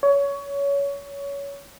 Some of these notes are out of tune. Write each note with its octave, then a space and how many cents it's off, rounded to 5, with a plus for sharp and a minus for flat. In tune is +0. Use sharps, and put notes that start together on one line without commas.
C#5 +20